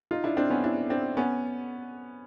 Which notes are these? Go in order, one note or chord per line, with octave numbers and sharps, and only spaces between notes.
D#4 F4
D4 E4
C4 D4
B3 C#4
D4 E4
C4 D4
B3 C#4